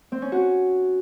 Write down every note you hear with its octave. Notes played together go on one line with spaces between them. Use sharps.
C4
C#4
F#4